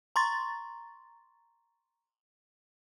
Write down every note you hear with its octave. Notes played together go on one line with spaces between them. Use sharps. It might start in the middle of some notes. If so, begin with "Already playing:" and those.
A#5 C6 C#6 A6